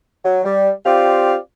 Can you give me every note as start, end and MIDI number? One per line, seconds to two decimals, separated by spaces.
0.25 0.39 54
0.45 0.70 55
0.85 1.36 60
0.85 1.36 65
0.85 1.36 67
0.85 1.36 74
0.85 1.36 77